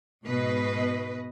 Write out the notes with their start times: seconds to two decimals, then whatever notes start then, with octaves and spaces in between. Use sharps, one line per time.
0.24 G#2 B2 B4 D#5